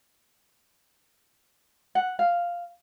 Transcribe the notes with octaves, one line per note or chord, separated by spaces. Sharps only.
F#5
F5